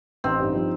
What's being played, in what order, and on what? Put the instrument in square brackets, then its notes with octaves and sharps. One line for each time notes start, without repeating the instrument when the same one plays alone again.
[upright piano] A1 [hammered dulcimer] C4 D#4
[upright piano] G2
F3